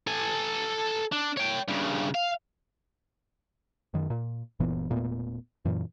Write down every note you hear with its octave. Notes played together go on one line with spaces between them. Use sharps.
A4 G#5
D4
C#5 G5
G2 C#3
F5
F#2 D#3
A#2
F#1 A#2 E3 B3
E1 A#2 A3 B3
F#2 A#2 E3